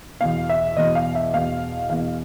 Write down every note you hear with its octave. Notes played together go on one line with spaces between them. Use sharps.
E2 B2 F5
E5
E2 B2 D#5
F5
E5
E2 B2 F5
E2 B2 F5